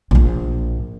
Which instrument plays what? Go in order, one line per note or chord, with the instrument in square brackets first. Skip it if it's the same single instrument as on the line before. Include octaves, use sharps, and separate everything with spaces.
[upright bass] A#1 A#2